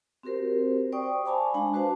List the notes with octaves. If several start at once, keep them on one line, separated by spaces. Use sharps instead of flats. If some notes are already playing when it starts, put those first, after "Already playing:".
C4 F#4 G4 A#4 C5
C5 D5 G5 C#6 D#6
F5 G#5 A5 B5 D6
G#3 D4 G#5
F#4 B4 C5 F5 A5